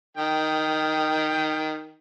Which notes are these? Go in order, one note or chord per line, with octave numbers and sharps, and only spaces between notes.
D#3 G5